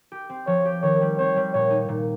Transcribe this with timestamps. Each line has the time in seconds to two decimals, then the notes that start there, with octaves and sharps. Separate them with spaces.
0.12 G4
0.30 C4
0.47 F3 C#5
0.65 G4
0.82 D#3 C#5
1.01 G3
1.18 C4 C#5
1.36 G3
1.54 A#2 C#5
1.70 D#4
1.88 A#2